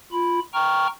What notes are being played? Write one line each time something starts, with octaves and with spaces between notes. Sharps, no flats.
F4 B5
G5 A#5 C#6 F6